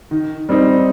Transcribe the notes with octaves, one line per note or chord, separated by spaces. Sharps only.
D#3
G3 C4 D#4